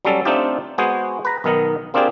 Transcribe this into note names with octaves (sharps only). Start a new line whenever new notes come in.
F#3 G3 C#4 A4
A3 C4 D4 D#4 F4 G4
G#3 B3 F#4 G#4 C5
B4 A#5
B1 D#3 B3 A#4 D#5
A#3 C4 D4 F4 G4 G#4